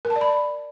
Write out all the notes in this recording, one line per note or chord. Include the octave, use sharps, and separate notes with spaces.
A#4
A5
D5
B5